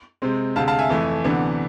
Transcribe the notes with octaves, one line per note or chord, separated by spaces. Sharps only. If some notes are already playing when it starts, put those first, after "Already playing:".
C3 G#3 C4
D2 C3 G#3 F5 A5
F5 A5
E5 G#5
F2 E3 A3
D2 C3 E3 B3 D4